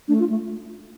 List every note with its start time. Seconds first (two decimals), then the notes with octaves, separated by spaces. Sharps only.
0.08 A3 D4
0.19 F4
0.30 A3